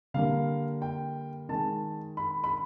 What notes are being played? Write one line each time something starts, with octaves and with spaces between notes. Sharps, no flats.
D3 G3 A#3 F5
G5
D#3 G#3 A5
B5
B5